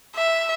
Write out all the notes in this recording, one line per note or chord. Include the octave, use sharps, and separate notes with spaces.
E5